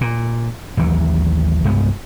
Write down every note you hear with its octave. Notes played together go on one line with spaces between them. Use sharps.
A#2
A1 D#2 E3 F#3
C2 G2 G#3 B3